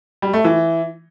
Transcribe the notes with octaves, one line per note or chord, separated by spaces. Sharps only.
G3
A3
E3